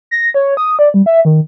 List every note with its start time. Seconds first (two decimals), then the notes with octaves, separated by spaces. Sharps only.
0.11 A#6
0.34 C#5
0.57 D#6
0.79 D5
0.94 G3
1.06 E5
1.25 D#3